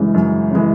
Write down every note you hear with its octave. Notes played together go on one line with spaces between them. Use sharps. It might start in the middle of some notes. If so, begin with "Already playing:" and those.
Already playing: F#2 C#3 E3 G#3
F#2
C#3 E3 G#3